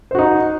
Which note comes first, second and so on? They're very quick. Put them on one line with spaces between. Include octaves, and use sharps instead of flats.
C5 F#4 D#4